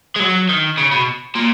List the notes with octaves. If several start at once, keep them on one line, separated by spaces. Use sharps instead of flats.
G#3
F#3
D#3
C#3
B2
A#2